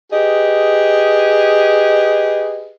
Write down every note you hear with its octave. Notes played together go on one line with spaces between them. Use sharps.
G4 G#4 B4 D#5